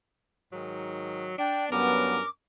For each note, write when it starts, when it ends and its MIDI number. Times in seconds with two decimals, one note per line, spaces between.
0.52 1.34 44
0.52 1.34 51
0.52 1.34 54
1.38 1.69 62
1.38 1.64 79
1.71 2.19 43
1.71 2.19 54
1.71 2.19 59
1.71 2.24 61
1.71 2.24 70
1.71 2.28 86